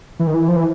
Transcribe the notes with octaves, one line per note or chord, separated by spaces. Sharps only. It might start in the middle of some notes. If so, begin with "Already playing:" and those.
E3
D#3
E3
F3
E3